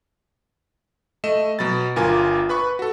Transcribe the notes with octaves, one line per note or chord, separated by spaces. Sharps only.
A3 D#5 E7
B2 F#3 B5 A6
G1 F4 A#4 G#5 D6
B4 B5 C#6
F#4 A4